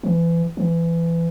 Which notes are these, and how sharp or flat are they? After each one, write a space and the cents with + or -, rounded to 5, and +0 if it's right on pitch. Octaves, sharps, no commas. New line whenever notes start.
E3 +30
E3 +25